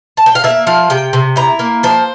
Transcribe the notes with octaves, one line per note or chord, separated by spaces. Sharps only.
A5
G5
F5
A#3 E5
F3 F5
C3 G5
C3
E4 A#5
A#3
F3 C5